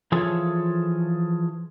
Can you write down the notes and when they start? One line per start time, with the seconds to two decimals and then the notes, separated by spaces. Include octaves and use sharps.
0.12 E3 F3 F4 G#4 A4 C#5